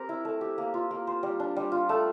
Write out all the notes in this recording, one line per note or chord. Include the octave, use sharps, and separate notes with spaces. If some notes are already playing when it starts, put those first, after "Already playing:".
Already playing: C4 G4 A#4
E4
A3
G4
A#3
F4
A#3
C5
G3
D4
G3
F4
A3